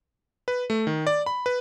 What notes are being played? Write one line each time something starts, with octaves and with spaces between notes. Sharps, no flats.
B4
A3
D#3
D5
B5
B4